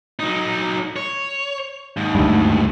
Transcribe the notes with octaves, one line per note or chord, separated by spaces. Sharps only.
F#3 D#4
C#5
D#2 G#2
D2 G2